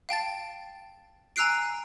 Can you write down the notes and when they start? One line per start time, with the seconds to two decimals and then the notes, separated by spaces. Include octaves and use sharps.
0.09 F5 G5 A5 A6
1.36 G#5 A#5 E6 F#6 C7 D7